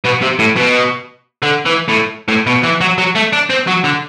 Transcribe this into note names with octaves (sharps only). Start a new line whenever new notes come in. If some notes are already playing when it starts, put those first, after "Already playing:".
B2
C3
A2
B2
D3
E3
A2
A2
B2
E3
F#3
F#3
A3
D4
C4
F#3
D3